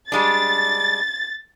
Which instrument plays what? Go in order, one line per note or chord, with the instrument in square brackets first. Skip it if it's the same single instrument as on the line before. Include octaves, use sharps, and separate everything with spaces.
[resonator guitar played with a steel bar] G3 G#3 D4 [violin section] A6